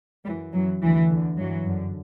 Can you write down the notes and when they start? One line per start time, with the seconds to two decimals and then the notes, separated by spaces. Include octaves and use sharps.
0.25 F#2 G3
0.30 E3
0.53 F#2 E3 F#3
0.82 D2 D3 E3
1.10 E2 D3
1.37 G2 E3 F#3
1.66 F#2 D3